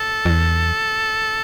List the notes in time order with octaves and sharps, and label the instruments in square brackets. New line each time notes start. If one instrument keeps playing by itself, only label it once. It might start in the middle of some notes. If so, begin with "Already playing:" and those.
Already playing: [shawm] A4
[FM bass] F2
E2